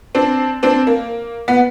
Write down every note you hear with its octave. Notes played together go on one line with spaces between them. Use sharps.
C4 D4
C4 D4
A#3
B3